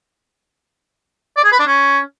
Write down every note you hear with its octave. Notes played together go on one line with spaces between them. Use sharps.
D5
G#4
B4
D4
C#4